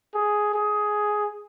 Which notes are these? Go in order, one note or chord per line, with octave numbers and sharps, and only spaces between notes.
G#4
G#4